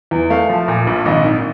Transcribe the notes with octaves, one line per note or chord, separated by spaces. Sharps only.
E2
A3 F5
F3
A#2
A#1
G#1 D#5
D#3